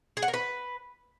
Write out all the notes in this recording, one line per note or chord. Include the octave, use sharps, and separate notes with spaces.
G#4
F#5
A#4
B4